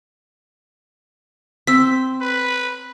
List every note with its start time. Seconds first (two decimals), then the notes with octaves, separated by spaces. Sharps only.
1.67 C4 E6 B6
2.21 B4